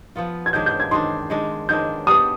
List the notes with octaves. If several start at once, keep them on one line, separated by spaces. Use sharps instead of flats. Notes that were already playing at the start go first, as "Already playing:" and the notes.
F3 B3 F4
G#6
D#3 G#3 D4 G6
G6
G#6
D#3 G#3 D4 C6
D#3 G#3 D4
D#3 G#3 D4 G6
G3 B3 D4 G#4 D#6